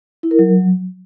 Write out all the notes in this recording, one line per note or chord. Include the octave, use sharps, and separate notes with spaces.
E4
A#4
F#3